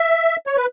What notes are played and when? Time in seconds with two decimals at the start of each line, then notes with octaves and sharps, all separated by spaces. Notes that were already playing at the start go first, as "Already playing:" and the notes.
Already playing: E5
0.47 C#5
0.57 B4